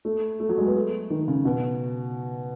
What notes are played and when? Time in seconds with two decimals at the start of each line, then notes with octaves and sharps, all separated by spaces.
0.05 A3
0.40 A3
0.49 F#3
0.58 G#3
0.66 B3
0.76 A3
1.10 D#3
1.28 C#3
1.45 B2